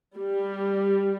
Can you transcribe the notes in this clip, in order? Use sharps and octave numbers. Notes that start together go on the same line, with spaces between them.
G3